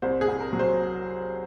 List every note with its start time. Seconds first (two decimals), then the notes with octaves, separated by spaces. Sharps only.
0.02 C2 C5
0.21 G#4
0.28 C2
0.40 A#4
0.53 F#3
0.59 C5